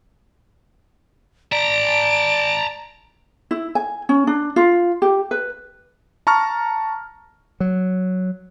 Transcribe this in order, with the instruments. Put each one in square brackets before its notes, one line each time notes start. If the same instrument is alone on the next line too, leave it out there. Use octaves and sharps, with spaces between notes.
[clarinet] D5 [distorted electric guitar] A5 A#5 [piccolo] D7
[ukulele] E4
G#5
C#4
D4
F4
G4
B4
[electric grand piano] A5 A#5 C#6 F6
[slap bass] F#3